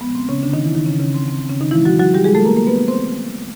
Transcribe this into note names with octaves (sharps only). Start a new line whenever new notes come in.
A#2 F3 G#3 B3
C4
C#3 C#4
D3 D4
D#3 D#4
E3 E4
D#3 D#4
C#3 C#4
C#3 C#4
C4
C4
C4
C#3 C#4
D#3 D#4
A2 E3 F3 G#3 E4
F#3 F#4
F#3 F#4
G3 G4
G#3 G#4
A3 A4
A#3 A#4
A#3 A#4
B3 B4
C4 C5